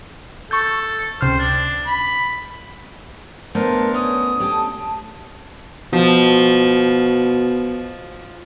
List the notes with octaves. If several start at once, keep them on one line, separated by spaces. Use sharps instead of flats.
A4 C#6 G6
C#2 C3 C5 F6
D4
B5
A3 B3 D4 A#4 C5
C#4 C#5 D#6
C#4 G4 A4
B2 F3